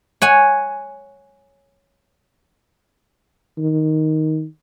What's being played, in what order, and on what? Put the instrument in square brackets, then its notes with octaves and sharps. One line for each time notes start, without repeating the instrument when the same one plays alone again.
[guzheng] C#5 F#5 G#5
[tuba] D#3